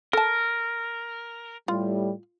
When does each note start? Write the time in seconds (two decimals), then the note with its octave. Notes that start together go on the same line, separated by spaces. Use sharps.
0.13 A4 A#4 A5
1.68 A2 G3 F4